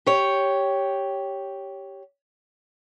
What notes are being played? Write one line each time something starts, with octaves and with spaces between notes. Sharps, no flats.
G4 C#5